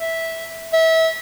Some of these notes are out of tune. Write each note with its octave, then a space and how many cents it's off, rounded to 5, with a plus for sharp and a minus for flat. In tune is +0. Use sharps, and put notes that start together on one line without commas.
E5 -10
E5 -30